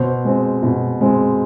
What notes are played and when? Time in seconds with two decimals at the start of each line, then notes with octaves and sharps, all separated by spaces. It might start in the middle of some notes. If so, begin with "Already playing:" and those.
Already playing: B2 C5
0.25 G#3 C4
0.63 B2
1.01 G#3 C4